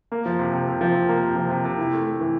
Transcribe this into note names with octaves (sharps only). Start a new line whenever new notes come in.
A#3
F3
C3
C3
C3
F3
C3
A#3
C3
F3
C3
C3
E4
A3
A3
E3